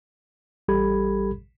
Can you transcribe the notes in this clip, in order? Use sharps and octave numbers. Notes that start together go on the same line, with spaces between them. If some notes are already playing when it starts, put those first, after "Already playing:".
A1 G3 G4 A4 B5 G#6